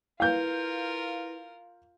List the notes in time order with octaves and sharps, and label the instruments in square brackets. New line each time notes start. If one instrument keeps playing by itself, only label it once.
[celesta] E4 B4 [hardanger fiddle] F4 A#4 [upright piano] F5 G6